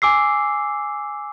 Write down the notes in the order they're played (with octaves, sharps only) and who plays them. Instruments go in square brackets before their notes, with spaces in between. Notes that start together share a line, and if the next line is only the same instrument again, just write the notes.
[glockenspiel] G#5 D6 E6 C7